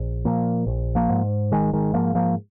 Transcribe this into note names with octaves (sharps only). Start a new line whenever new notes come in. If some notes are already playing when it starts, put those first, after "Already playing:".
Already playing: A#1
A#2 F3 A#3
A#1
F3 A#3
G#2
G#1 D#3 G#3
D#3 G#3
G#2 F3 A#3
F3 A#3